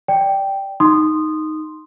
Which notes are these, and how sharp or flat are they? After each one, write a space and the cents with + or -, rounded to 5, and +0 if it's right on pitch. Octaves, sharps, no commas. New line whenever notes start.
D5 +0 G5 +0
D#4 +0 C6 +0 D#6 -15